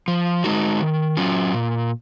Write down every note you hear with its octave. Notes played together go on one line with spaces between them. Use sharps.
F3
G#3 D#4 F#4
D#3
F#3 C#4 F4
A#2